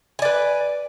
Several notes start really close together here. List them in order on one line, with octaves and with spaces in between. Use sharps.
G#5 D5 B4